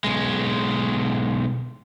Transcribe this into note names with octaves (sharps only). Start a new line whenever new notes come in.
B1 G#3